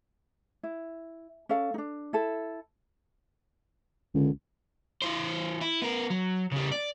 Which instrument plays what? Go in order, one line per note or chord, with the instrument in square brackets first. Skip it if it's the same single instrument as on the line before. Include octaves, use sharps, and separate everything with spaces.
[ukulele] E4
C#4 A4 F5
D4 D#4
E4 A4
[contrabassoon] C#2 [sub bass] D3
[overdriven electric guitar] E3 C5
E4
B3 A#4
F#3
C#3 G3
D5